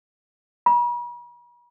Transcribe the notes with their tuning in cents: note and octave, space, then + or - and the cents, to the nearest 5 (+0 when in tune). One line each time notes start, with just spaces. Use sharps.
B5 -45